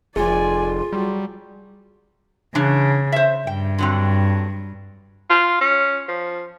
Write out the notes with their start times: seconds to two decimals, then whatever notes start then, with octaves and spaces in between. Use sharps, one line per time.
0.16 F1 F4 G#4 D5 G#5
0.93 F#3 G3
2.55 C#3 E3 D4
3.12 C5 E5
3.47 G2 G5
3.78 D3 F#3 C4
5.30 F4
5.61 C#4
6.08 F3